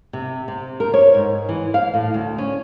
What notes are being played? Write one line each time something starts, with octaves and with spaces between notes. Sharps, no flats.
C3
C3
A#4
C#5
G#2
E3
F5
A2
D2
C#4